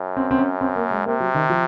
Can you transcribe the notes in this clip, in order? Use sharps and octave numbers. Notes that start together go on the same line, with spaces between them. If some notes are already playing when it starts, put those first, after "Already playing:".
Already playing: F#2
C4
C4
C#4
C4
A#3
G#3
C3 A#3
F#3
D#3
F3